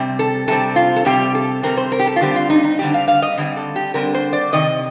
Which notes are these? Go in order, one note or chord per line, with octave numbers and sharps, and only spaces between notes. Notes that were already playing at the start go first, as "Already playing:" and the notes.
Already playing: C3 G3 C4
A4
C3 G3 C4 A4
F4
A4
C3 G3 C4 G4
A4
C3 G3 C4 A#4
C5
A#4
G4
A4
F4
D3 G3 C4 G4
F4
D#4
D#4
D3 G3 C4 G4
F5
F5
D#5
D3 G3 C4
A4
G4
D3 G3 C4 A#4
C5
D5
C3 D#3 D#5